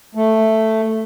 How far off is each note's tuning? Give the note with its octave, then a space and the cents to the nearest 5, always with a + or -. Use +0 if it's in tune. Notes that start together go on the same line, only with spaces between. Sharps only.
A3 +5